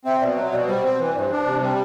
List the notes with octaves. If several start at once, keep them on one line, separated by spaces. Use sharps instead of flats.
C4 E5
B2 D5
F#3 E5
B2 D5
G3 C5
C4
E3 B4
G2 C5 D5
D4
C3
G3